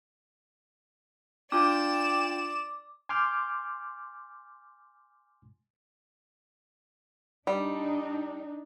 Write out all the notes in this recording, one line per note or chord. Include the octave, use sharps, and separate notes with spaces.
D4 F4 D5 G5 D6 G6 E7
G#5 C6 D6 F6 G6
G3 D4 D#4